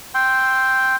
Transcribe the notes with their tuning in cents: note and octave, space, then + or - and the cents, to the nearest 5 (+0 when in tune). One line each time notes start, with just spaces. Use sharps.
G5 +0 C6 +0 E6 +0